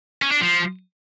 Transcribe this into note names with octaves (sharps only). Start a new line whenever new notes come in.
C#4
D4
F3